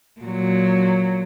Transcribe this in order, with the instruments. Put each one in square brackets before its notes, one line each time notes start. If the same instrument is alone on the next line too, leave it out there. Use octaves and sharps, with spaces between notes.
[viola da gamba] A#2 F#3